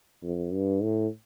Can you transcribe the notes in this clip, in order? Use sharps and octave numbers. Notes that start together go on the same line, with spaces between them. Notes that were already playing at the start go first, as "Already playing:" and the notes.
F2
G2
A2